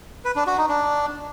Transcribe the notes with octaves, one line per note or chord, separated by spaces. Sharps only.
B4
D4
F#4
D#4
D4